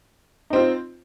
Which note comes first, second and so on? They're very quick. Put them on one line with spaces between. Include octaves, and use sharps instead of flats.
D#4 C4 F4